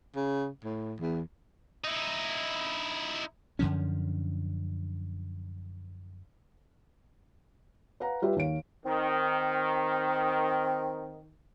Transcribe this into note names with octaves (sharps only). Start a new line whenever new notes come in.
C#3
A2
E2
D#4 E4
F#2 D3 F3 C#4
B4 F5 F#5 A#5
G3 F4 G4 B4 E5
D#2 C#5 F5 D7
D#3 C4